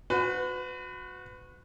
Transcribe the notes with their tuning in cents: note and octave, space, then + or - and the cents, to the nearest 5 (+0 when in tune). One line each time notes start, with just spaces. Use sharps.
F#4 -25 B4 +30